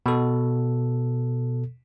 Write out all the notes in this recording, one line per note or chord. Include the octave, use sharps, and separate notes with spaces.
B2 A4